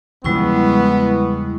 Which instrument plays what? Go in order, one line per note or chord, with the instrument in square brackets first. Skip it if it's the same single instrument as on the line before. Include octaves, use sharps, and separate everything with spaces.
[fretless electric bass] E2 C#3 F3 [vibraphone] G3 E4 C#6 [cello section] G#3 [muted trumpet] B3